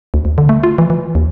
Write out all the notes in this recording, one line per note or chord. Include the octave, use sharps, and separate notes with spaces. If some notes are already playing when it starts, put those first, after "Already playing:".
D2
D2
D3
A3
F4
E3
E3
D#2